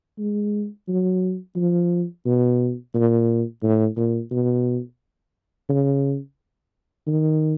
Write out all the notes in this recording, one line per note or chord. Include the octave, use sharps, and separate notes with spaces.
G#3
F#3
F3
B2
A#2
A2
A#2
B2
C#3
D#3